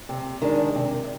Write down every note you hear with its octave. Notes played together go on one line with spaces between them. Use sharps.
C3
D#3 G#3 D4
C3